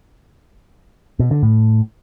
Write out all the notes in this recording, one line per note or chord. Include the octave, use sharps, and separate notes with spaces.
B2
D3
A2